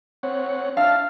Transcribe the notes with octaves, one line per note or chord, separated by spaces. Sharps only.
C4 C#5 F#5
D4 E5 F5 A5 F6